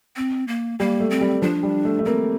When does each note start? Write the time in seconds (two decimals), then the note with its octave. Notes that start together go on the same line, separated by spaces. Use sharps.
0.16 C4
0.48 A#3
0.79 G3 A#3
1.00 A3
1.11 C4
1.21 G3
1.42 F3 D4
1.63 G3
1.85 A3
1.99 A3
2.06 A#3 C4